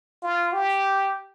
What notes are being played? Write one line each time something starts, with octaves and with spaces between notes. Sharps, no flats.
F4
G4